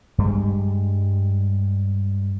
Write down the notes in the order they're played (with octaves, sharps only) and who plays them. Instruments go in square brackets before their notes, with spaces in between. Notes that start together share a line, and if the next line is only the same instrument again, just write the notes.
[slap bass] G2 G3 G#3